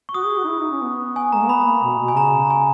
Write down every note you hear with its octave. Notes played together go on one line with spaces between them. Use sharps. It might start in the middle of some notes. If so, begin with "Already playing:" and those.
C#6
F#4 D#6
G#4
F#4
D#4
E4
D#4
C#4
B3
G#5
G#3 A#5
A#3
B3 B5
A#3
B2
B2
G#5
C#3 A#5
G#5